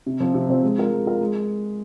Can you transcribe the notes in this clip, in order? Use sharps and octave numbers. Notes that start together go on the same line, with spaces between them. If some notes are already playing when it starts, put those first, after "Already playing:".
C3
F3 C4
C3
F3 C4
G#3
F4 A#4
G#3
F4 A#4
G#3